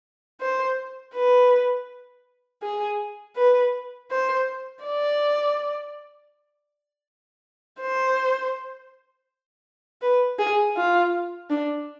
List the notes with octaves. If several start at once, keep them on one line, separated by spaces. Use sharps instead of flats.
C5
B4
G#4
B4
C5
D5
C5
B4
G#4
F4
D4